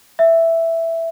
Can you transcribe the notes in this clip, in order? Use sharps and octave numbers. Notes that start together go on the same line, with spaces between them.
E5